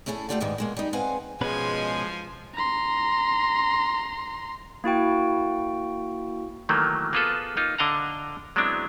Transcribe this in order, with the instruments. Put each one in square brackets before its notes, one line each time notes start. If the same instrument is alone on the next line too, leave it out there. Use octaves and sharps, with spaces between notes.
[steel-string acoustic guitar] A3 C#4 E4 G#4 A4
A3 D4 F4 G4 D5 F#5
E2 G#2 D#3 G3 B3
B2 G#3 A#3
G3 D#4
G#3 C4 B4 F5 F#5 G#5
[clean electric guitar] B2 C#4 B4 [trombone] F3 [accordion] G#3 [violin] G#5 C6
[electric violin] A#5 C6
[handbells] A#3 E4 F#4 G5
[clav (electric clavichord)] D#3 E3 F#3 A3 A#3
A#3 B3 F4 G#4 A4 B4
A#3 D#4 F4
D3 D4 D#5 F5 F#5 A#5
F#3 G#3 B3 C4 D4 E4